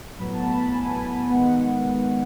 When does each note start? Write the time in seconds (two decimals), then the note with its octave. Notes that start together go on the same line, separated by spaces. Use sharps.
0.19 A2 F#3 B3 B5
0.33 A5
0.46 B5
0.61 A5
0.74 G#5
1.29 D#3 G#3 B3 F#5